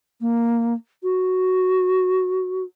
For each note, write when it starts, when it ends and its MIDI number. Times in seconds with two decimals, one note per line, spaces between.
0.21 0.74 58
1.03 2.64 66